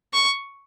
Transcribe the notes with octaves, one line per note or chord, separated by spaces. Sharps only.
C#6